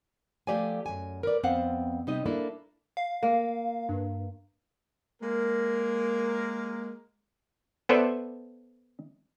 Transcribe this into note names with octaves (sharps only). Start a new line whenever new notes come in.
F3 A3 G4 D5 F5 G#5
F#2 G#5
A#4 B4 D5
F2 B3 C4 C5 F5 F#5
C3 G3 D#4 D#5
A#3 D4 E4 A4
F5
A#3
G2
G#3 A#3 A#4
B3 A4 B4 C5 D5 E5